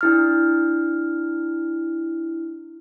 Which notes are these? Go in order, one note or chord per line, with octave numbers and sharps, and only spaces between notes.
D4 E4 F6